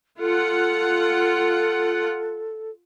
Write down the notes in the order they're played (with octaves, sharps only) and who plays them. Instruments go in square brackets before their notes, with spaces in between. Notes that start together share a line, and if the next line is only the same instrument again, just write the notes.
[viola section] F4 F#5 [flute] A4